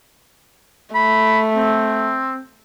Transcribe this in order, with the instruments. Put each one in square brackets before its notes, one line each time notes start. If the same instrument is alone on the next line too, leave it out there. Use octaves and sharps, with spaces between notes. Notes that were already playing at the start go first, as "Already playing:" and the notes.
[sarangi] A3 [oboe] B5
[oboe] C4